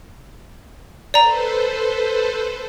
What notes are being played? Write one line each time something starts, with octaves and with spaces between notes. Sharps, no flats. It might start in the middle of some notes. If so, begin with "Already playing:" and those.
A4 B4 C5 D5 A#5